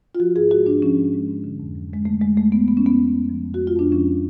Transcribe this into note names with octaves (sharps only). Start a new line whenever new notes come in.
F4
F3 F#4
G#2 G#4
G#3 F#4
G#2 D4
F3 C#4
G#2
G#3
G#2
D3
F2
F#3
F2 G#3
D3 A3
F2 G#3
F#3 A3
F2 B3
F3 B3
C#4
F2 B3
G#3
F2
F3
F2
F#4
G#3
F4
F2 D4
F3 C#4